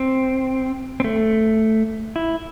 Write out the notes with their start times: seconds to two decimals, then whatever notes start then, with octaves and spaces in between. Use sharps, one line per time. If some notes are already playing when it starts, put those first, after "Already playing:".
Already playing: C4
1.00 C4
1.04 A3
2.16 E4